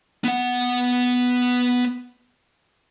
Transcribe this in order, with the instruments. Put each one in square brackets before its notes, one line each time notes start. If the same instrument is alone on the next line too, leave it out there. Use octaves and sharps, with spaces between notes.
[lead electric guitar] B3 F#5